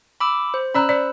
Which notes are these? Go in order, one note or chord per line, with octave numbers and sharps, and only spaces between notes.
B5 D6 E6
C5
C#4 D5 A#5 B5 E6 F#6
C5 D5